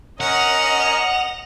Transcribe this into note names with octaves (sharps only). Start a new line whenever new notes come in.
C#4 A#4 D#5 F#5 F7